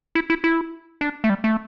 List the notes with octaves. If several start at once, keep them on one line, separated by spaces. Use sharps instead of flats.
E4
E4
E4
D4
A3
G3
A3